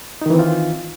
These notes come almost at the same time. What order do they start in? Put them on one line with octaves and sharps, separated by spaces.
D#4 D#3 E3 C4 F4